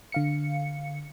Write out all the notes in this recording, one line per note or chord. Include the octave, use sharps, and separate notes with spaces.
D3 F5 C#7